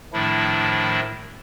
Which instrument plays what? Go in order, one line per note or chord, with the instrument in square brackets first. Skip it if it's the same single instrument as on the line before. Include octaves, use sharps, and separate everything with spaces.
[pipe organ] A2 D#3 F3 A3 D4 E4